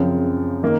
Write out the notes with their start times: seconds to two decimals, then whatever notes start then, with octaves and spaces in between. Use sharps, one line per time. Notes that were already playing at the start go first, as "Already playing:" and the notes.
Already playing: F#2 C#3 F3 C4
0.63 D#3 A#3